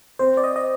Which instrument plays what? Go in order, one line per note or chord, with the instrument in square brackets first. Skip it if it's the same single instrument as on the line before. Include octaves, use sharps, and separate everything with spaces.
[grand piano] C4 [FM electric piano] C5
[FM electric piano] D5
D#5
D#5